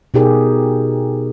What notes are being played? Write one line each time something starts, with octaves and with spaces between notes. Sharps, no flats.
B2 D#4 G4 G#4 A#4